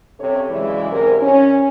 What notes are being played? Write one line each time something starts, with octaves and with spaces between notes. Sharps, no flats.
G2 C3 C#4 A4 C#5
C#3 E3 F#3 G#3 E4 D5
G#2 C3 A#4
C#4